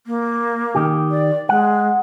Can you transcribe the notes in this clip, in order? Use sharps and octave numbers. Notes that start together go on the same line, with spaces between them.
A#3
D#3 G4
D5
G#3 F#5